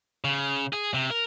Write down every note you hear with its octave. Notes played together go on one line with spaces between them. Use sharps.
C#3
G#4
C3
A#4